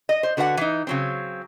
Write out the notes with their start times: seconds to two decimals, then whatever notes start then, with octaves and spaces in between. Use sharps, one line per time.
0.09 D#5
0.23 C5
0.37 D3 F#4 B4 C5 F#5
0.57 E3 D#4
0.87 C#3 F#3 C4